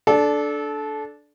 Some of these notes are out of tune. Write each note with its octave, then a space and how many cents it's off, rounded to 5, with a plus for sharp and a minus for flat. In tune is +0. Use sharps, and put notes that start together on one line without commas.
D4 +0 A4 -20